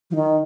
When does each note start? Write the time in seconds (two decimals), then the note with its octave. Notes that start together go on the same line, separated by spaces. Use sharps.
0.11 F3
0.15 D#3